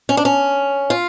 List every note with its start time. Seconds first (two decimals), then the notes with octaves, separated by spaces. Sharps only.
0.09 C#4
0.17 D4
0.25 C#4
0.90 F4